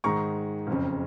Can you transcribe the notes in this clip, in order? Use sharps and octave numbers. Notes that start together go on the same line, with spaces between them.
G#2 D#3 G#3 A#5 C#6
F#1 F2 C#3